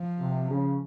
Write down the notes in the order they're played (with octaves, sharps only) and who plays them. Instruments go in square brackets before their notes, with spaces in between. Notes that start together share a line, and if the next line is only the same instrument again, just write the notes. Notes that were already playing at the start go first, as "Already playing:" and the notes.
Already playing: [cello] F3
[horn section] C3
C#3